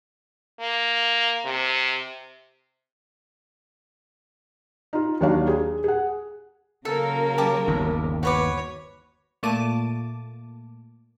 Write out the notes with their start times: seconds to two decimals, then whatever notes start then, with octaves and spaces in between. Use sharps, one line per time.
0.60 A#3
1.45 C3
4.93 D#4 F4
5.21 D#2 F#3 D4 F#4 C#5 F5
5.48 G#4
5.84 G#4 F#5
6.85 C#3 F#3 A#3 A4 A#4
7.38 G4 A5 D6
7.68 G1 D#2
8.23 F#4 B4 C#5 D6
9.43 A#2 A3 A#3 A5 D6 D#7